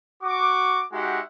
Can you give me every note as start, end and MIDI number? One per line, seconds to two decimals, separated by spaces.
0.22 0.82 66
0.22 0.82 85
0.22 0.82 86
0.93 1.20 56
0.93 1.20 63
0.93 1.20 66
0.93 1.20 67
0.93 1.20 76
0.93 1.20 78